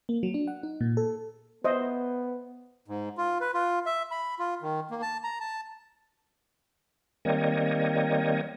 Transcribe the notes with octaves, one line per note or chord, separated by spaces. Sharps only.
A#3
F#3
D4
F#5
D#4
A#2
A4
B3 C5 D#5 E5
G#2
F4
B4
F4
E5
B5
F4
D#3
A#3
A5
A#5
A5
D#3 G3 A#3 C4 C#5 D#5